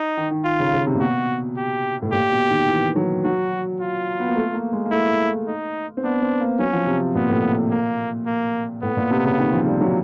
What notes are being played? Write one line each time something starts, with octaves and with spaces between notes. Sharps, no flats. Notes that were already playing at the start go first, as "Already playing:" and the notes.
Already playing: D#4
D#3
D#3
F4
C#3
C#3
C3
A#2
B2 F#4
G4
A2
A#2 G4
B2
D#3
E3
F#3
F#3 F#4
F4
B3
A#3
A3
A#3
G#3
A#3
A3 E4
D#4
C4
B3 D4
C4
A#3
F#3 C#4
F3
C3
A#2 B3
A2
A#2
A#3
A#3
A2 B3
A#2
C3
C#3
D#3
F3
G3
F#3